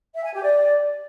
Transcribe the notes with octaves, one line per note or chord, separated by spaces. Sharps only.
E5
G#5
G4
D5